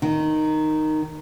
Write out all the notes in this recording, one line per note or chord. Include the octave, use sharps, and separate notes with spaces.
D#3